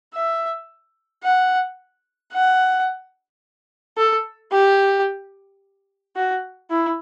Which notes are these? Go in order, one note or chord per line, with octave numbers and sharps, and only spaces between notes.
E5
F#5
F#5
A4
G4
F#4
E4